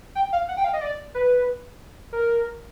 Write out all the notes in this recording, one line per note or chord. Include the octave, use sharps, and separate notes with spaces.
G5
F5
F#5
G5
F5
D#5
D5
B4
A#4